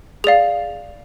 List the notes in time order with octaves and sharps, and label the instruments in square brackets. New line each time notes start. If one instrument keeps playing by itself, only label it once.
[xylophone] G#4 D5 F5 F7